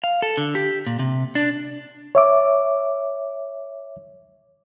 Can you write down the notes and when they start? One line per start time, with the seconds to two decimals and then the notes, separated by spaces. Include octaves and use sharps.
0.04 F5
0.22 A4
0.37 D3
0.55 G4
0.86 A#2
0.99 C3
1.35 D4
2.15 C#5 E5 D6